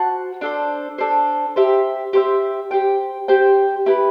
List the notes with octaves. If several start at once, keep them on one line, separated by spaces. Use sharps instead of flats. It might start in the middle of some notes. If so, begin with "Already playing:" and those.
Already playing: F#4 C5 F#5 A5
D4 A4 C5
D4 A4 C5
G4 C5 E5
G4 C5 E5
G4 C5 G5
G4 C5 G5
E4 G4 B4